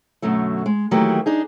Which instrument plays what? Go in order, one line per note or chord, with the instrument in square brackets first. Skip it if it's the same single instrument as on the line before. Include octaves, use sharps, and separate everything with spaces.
[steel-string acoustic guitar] F#2 B2 D3 F#3 A3
G#3
D#3 E3 F#3 A3 A#3 G4
D4 D#4 G#4